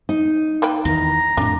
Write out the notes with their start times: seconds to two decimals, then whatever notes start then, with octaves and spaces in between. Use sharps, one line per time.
0.09 D#4
0.62 A#3 B4 G5
0.85 E2 D#3 A#5
1.37 F2 A2 D4